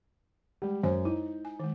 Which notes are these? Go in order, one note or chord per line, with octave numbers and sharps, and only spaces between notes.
G3 G#3
F#2 C5 G#5
D#4 E4
G#5
D#3 G#3